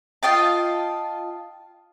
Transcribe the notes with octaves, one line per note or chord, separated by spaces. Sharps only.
F4 D#5 G5 A5